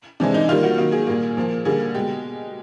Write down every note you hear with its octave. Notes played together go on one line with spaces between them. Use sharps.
C3 E3 G#3 D4
D#4
D#3 G3 A#3 F4
F#4
D#3 F#3 A#3
G#4
A#2 G3 A#3
A#2 F3 A#3
D3 G3 A#3 G#4
B2 G#3 G4